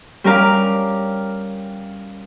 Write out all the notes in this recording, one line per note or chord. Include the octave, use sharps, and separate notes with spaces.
G3 C#4 A#4 F5 D6